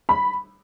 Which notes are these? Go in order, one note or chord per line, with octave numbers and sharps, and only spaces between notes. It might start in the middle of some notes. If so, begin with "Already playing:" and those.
B5